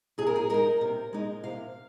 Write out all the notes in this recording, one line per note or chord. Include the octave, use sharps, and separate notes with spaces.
C3 G#4
A#4
G#4
G#3 D#4 A#4
C3
G#3 D#4
C3 F5